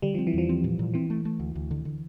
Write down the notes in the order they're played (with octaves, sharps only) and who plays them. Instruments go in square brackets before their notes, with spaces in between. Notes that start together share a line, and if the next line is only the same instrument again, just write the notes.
[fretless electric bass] D3 [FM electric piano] G3
[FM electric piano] F3 [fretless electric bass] C4
[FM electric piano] E3
[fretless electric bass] E2 [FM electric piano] F3
[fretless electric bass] C4
A#2
A#2
[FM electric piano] E3 [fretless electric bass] C4
[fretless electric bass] A3
A3
D2
D2
D3
D3